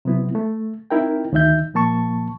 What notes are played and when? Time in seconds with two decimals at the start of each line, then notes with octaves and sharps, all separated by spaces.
0.05 C3 F#3 B3 E4
0.35 A3
0.91 C4 D#4 E4 A#4 G5
1.33 D2 D#3 D#4 E5 G6
1.74 A#2 F3 A#3 A5 C#6